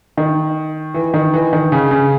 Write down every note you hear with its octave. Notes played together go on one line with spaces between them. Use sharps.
D#3
E3
D#3
E3
D#3
C#3
C#3